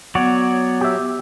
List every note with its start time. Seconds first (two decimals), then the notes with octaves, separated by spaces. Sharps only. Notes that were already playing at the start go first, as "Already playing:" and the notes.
0.15 F#3 B3 C#5 D5 F#5
0.81 G4 E5